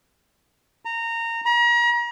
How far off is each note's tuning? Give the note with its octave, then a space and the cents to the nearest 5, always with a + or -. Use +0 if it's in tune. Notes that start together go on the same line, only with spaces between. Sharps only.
A#5 -20
A#5 +40